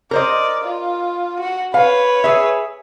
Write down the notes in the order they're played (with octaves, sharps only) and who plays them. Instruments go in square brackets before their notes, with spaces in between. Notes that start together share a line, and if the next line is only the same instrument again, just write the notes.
[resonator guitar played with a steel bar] A#4 C5 D#5 [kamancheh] D5
[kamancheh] F4
F#4 F#5
[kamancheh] B4 C#5 [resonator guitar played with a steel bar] F5
[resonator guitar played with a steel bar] G#4 E5